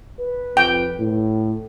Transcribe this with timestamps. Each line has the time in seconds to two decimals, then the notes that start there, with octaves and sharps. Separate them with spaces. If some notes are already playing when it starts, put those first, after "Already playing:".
0.21 B4
0.57 F2 G5
0.99 A2